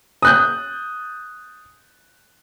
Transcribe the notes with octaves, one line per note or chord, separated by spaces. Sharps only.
D#6 F#6 G6